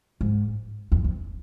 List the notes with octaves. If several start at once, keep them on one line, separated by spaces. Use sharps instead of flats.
G#2
E2
F2